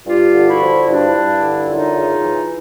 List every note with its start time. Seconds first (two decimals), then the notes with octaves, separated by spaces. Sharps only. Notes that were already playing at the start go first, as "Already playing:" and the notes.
0.07 G2 F4 G4
0.33 D3
0.48 E4 F#4
0.61 F3
0.87 G2 D4 E4
1.15 G2
1.43 D3
1.69 F#2 D#4 F4
1.96 C#3
2.23 E3